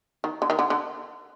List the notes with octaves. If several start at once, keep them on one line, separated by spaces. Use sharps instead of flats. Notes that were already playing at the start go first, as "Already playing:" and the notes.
D#3
D3
D#3
D3
D3